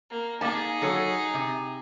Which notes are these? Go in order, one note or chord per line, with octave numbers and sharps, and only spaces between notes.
A#3
A#3 D#4 G#4 A5
F#3 A4 C#5
C3